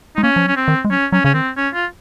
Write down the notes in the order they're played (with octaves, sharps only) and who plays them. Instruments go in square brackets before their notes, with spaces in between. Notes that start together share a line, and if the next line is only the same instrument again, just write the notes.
[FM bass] G#3 [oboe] D#4
[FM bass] A#3 [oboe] C#4
[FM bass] F3
[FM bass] F#3 [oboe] C#4
[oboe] C4
[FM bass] D#3
G#3
[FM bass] F#3 [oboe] C#4
[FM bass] F#3 [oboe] C#4
[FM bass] C#3 [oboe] C#4
[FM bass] D#3 [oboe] C4
[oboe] C#4
F4